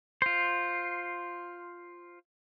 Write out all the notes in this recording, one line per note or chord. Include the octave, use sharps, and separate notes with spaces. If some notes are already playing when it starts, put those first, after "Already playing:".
F4 C5